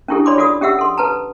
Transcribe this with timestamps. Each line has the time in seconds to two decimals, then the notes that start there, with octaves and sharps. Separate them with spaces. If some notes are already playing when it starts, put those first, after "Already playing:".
0.08 C#4 D4 E4 G4 A4
0.26 C#5 D5 B5 C6 D6
0.38 F4 F#4 A4 D5 D6 D#6
0.61 C#4 G4 E5 F#5 E6
0.79 A4 C6
0.98 A4 B4 A5 A#5